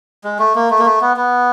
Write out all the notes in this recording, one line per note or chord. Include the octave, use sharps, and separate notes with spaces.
G#3
A3
A#3
A3
A#3
A3
B3
B3